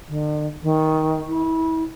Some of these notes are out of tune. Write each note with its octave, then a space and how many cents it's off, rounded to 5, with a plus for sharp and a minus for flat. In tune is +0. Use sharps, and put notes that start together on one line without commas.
D3 +45
D#3 +15
E4 -30